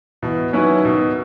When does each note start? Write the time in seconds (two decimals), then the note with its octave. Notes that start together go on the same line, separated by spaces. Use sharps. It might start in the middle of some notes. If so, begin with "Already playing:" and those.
0.22 B2 E3
0.53 D#3 F#3 C#4 E4 B4
0.85 B2